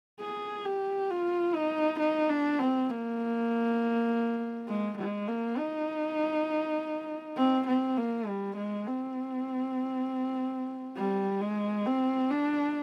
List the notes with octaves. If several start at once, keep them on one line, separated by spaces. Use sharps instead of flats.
G#4
G4
F4
D#4
D#4
D4
C4
A#3
G#3
G#3
A#3
D#4
C4
C4
A#3
G3
G#3
C4
G3
G#3
C4
D4